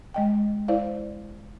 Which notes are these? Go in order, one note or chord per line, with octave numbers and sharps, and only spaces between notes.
G#3 D#5 G5
E4 C5 D5 F5